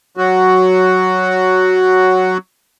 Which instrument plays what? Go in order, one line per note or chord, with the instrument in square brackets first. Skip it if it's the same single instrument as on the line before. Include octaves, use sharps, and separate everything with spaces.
[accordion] F#3 F#4